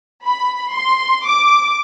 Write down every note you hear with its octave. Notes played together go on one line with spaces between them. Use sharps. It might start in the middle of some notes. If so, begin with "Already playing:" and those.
B5
C6
D6